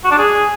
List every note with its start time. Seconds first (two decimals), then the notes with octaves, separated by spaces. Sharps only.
0.04 F#4
0.11 D4
0.18 G#4